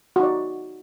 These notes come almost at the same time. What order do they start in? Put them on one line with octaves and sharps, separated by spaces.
F#4 D#4 D5